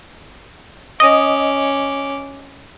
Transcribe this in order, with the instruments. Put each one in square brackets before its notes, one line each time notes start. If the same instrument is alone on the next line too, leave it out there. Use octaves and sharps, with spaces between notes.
[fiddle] C#4 D6 [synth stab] D#5